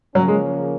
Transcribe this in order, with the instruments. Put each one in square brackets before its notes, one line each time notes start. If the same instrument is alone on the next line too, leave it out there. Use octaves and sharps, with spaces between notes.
[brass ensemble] C#3 F3 A#3 C#4 [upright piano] F#3
[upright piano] G#3